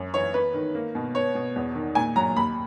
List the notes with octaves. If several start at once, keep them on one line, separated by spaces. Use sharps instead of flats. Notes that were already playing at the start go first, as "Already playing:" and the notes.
Already playing: F#2
E3 C#5
B3 B4
D#3
A#3
B2
B3 C#5
B2
E2
D#3
A#2 G#5
F#3 A#5
D#2 B5